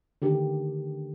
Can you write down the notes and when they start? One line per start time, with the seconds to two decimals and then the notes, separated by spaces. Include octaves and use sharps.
0.22 D3 D#3 G4